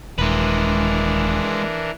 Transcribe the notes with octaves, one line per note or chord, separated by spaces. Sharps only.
D#1 E3 G#3 D4 A#4 B4